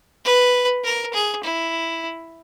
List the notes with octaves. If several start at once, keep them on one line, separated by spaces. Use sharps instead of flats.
B4
A#4
G#4
E4